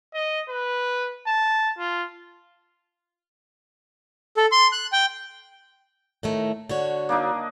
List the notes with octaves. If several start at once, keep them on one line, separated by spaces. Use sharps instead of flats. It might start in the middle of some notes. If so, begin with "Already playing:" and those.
D#5
B4
A5
F4
A4
C6
F#6
G5
A2 D#3 A3
D3 F#4 C#5
A#3 D4 D#4